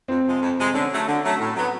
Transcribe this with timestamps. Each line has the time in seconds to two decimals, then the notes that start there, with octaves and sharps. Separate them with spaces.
0.08 F2 C4
0.25 C3 F3 G#3
0.41 F2
0.58 C3 F3 G#3
0.74 D3 C#4
0.91 F#3 A3
1.07 D3
1.23 F#3 A3
1.40 A2
1.56 F#3 B3